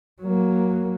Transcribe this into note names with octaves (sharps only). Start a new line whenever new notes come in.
F#3 A#3